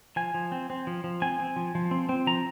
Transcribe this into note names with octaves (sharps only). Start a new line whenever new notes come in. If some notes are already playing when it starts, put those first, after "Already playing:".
F3 G#5
F3
C4
C4
F3
F3
C4 G#5
C4
F3
F3
C4
C4
F3 A#5